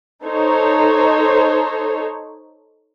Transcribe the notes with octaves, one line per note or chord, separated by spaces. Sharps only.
D#4 A4 C5 C#5